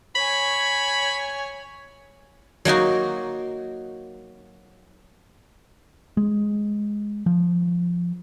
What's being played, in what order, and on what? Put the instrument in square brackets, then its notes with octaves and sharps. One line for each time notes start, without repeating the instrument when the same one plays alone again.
[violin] C#5 G#5 [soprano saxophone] B5
[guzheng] F#3 A#3 D#4 F#4
[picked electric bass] G#3
F3